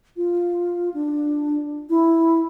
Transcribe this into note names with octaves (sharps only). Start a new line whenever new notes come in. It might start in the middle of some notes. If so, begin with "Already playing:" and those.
F4
D4
E4